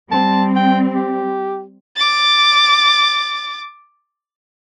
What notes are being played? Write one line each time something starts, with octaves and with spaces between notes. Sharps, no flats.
G3 C4 A5
G5
G4
D6 A6